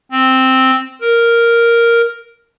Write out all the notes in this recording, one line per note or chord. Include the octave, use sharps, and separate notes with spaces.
C4
A#4